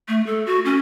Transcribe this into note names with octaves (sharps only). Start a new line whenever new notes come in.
A3
A4
F#4
C#4